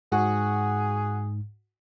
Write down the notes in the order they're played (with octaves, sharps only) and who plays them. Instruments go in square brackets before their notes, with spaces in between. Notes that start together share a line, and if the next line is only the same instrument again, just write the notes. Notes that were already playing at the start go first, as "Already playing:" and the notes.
[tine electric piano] G#2 [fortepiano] F#4 [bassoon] G#4